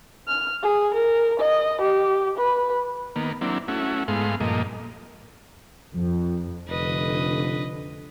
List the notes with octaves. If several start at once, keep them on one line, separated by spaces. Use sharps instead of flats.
F6
G#4
A#4
D#5
G4
B4
D#3 A#3 B3
F#3 A#3 C4 D4 E4
A3 C#4 E4 F#4
G#2 G#3 A3 B3 F5 C6
G2 A#2 F3 A3 A#3 D#5
F2 F3
F1 D3 B4 D#5